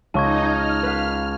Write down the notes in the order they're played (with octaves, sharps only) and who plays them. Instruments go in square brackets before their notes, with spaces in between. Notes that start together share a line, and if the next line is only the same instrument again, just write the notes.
[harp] C#2 [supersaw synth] D#4 D#5 [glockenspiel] A5 C#6 G#6
[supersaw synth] F6 [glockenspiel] G#6
[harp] B4 F5